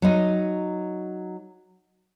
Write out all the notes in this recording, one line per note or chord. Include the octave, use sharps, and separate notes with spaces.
F#3 D#4 D#5